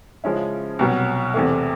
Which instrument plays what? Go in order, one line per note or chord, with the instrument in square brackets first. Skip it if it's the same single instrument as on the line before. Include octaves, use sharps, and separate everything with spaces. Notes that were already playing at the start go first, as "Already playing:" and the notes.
[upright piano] C#3 F3 G#3 C#4 E4
C2 B2 F#3
E2 C3 E3 A3